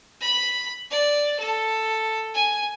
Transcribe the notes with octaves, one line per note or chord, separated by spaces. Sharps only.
B5
D5
A4
G#5